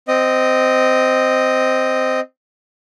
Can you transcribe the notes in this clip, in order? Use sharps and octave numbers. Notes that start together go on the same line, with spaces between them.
C4 D#5